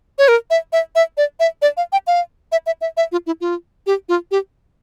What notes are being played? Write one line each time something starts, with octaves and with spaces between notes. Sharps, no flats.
C#5
A#4
E5
E5
E5
D5
E5
D5
F5
G5
F5
E5
E5
E5
E5
F4
E4
F4
G4
F4
G4